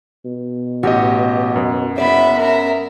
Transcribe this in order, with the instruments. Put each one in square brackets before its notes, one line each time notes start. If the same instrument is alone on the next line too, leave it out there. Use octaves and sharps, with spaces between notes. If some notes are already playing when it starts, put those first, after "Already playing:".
[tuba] B2
[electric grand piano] A1 G4 D#5 [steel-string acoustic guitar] F#4
[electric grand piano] F#2
[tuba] F#1 [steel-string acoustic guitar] B3 D5 [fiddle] E5 B5
[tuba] C#4 [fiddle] A#4 E5